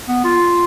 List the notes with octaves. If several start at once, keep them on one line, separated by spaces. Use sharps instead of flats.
B3
F4